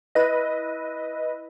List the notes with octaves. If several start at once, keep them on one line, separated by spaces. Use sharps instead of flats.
E4 B4 D#5